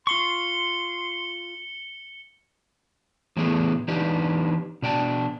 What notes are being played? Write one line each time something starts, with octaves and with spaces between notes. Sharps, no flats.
F4 C6 C#6 C#7 G7
A2 E3 A3 B3 G#4
E3 D4 D#4 G4 B4
B2 D4 G5 A5